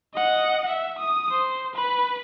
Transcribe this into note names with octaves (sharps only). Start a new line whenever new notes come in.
D#5 F#5
E5
D#6
C5
B4 B5